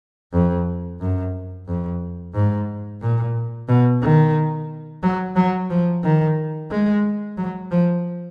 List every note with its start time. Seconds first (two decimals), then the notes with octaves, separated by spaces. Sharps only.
0.33 F2
1.01 F#2
1.67 F2
2.34 G#2
3.02 A#2
3.68 B2
4.02 D#3
5.03 F#3
5.36 F#3
5.70 F3
6.03 D#3
6.71 G#3
7.37 F#3
7.71 F3